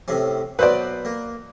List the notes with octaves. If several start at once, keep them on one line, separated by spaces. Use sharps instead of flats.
A2 C3 C#4
B2 F#3 B4 C5 D5
A#3